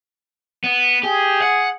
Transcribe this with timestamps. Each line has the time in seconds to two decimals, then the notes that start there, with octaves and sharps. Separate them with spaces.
0.64 B3
1.03 G4 G#4
1.42 F#5